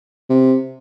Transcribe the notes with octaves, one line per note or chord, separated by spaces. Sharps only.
C3